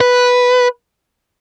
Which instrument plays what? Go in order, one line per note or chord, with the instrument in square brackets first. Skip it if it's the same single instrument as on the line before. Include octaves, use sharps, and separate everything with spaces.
[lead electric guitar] B4